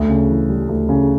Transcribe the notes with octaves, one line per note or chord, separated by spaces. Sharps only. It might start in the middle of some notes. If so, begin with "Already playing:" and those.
Already playing: D2
C#3
E3
G3
D2
C#3